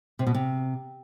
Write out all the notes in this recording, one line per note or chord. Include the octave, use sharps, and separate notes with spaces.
C3
B2
C3